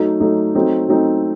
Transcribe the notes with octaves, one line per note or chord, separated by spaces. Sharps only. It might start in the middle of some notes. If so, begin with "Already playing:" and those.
Already playing: F#3 A3 D#4
F#3 A3 D#4
F#3 A3 C4 D#4
F#3 A3 C4 D#4